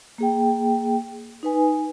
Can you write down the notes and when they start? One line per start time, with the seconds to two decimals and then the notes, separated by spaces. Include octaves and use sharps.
0.18 A#3 G#4 G5
1.43 D#4 B4 G#5